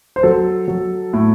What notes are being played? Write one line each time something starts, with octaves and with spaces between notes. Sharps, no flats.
C5
F#3 A4
F#3
A2